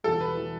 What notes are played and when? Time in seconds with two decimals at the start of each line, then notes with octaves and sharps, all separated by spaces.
0.04 E1 E2 E3 G3 A4
0.21 B4
0.37 E3 G3